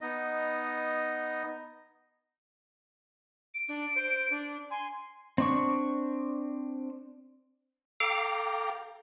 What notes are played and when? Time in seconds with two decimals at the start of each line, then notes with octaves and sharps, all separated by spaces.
0.01 B3 D#4 D#5
3.54 D7
3.68 D4
3.95 C5
4.30 D4
4.70 G#5 C6
5.38 C4 D4 C#6
8.00 A4 F5 G5 A#5 D6